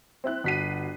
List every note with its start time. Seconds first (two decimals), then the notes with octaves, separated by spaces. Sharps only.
0.24 C4 E4 F#6
0.44 G1 F#4 B6 C7 D#7